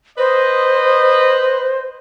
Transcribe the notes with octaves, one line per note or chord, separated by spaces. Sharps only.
B4 C5 D#5